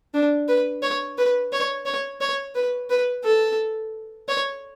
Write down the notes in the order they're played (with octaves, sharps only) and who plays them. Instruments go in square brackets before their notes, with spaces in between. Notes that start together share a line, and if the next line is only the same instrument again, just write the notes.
[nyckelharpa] D4
B4
C#5
B4
C#5
C#5
C#5
B4
B4
A4
C#5